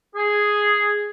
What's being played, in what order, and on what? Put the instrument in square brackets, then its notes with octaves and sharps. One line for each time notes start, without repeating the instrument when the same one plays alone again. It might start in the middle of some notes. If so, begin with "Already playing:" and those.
[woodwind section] G#4